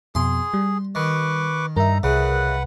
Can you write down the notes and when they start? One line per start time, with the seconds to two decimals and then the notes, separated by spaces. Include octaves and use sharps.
0.15 F2 B2 G#4 C6
0.54 G3
0.95 D#3 B4 C#6 D6
1.77 G2 D#4 A#4 E5 A#5
2.03 C2 C#3 B4 F#5